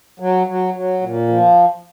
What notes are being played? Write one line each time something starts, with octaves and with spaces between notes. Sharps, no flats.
F#3
F#3
F#3
A#2
F3